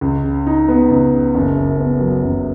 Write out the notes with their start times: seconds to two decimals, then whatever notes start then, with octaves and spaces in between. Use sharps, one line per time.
0.01 C#2
0.24 C#3
0.46 D#4
0.68 B3
0.90 C#2
1.13 C#3
1.35 F#1
1.57 F#2
1.79 B3
2.01 F#3
2.24 F#1